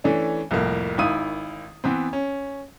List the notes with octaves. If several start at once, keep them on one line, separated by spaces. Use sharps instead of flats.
E3 A3 C#4 D4
C2 F2 A2 A#3
G#1 D#3 E4 F5 D#6 D#7
E3 B3 C4
C#4